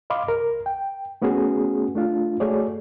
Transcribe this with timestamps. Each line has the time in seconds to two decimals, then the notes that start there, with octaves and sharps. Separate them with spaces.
0.10 D#5 F5 B5 C6 D6
0.27 C2 A#4
0.66 G5
1.22 A3 B3 C#4 F#4 G#4
1.95 A3 D4 F4
2.40 A3 F#4 G#4 C#5 D5